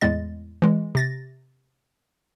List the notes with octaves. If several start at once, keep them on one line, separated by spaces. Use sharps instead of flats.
E2 A2 G#3 D#5 A6
E3 G#3
C3 A6 A#6